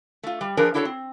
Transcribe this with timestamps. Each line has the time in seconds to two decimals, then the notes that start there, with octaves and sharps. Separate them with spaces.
0.23 A3 F4
0.41 G3
0.57 F3 D4 G#4 A#4 B4
0.74 D4 E4 F#4 A4 C5 C#5
0.85 C4